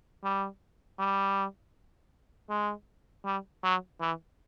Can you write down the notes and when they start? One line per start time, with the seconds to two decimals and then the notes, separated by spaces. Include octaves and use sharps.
0.23 G3
0.99 G3
2.49 G#3
3.25 G3
3.64 F#3
4.00 E3